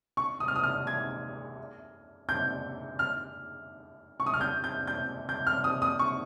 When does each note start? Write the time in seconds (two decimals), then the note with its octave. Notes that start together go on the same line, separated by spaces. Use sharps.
0.17 C#6
0.40 D#6
0.48 F6
0.56 D#6
0.63 F6
0.87 G#6
2.29 G6
2.99 F6
4.20 C#6
4.26 D#6
4.34 F6
4.41 G6
4.64 G6
4.87 G6
5.29 G6
5.47 F6
5.64 D#6
5.82 D#6
5.99 C#6